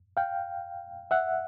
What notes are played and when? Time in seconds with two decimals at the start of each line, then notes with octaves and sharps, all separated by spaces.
0.17 F5 G5
1.11 E5 F#5